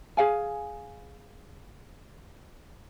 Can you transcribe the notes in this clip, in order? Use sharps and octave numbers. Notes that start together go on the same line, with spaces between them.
G#4 F5 G#5